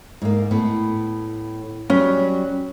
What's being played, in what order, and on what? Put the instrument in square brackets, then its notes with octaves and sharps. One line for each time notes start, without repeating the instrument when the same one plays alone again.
[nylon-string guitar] G#2 A#3
A2 B3
[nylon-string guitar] F#3 G3 [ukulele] C#4